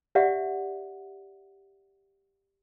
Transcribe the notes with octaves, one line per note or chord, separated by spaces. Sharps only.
G4 D5 E5 F#5